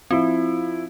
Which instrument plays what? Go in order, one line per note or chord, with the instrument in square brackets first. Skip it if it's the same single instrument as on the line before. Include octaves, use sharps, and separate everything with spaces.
[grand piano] F3 E4 [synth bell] C4